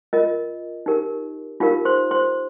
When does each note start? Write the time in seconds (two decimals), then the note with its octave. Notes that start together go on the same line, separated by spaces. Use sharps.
0.13 F4 A#4 D#5
0.86 D#4 G4 A#4
1.60 D#4 F4 G4 A#4 F5
1.85 C5 C6
2.11 C5 C6